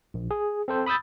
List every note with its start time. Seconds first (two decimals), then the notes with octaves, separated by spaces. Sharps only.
0.14 A#1
0.31 G#4
0.68 C4 A4 C5
0.86 B5 D#6 E6 G6 A6